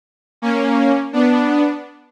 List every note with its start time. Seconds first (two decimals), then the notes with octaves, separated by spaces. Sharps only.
0.42 A#3 C#4
1.13 B3 D4